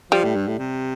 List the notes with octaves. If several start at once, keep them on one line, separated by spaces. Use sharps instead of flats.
F3 G3
A2
G2
A2
C3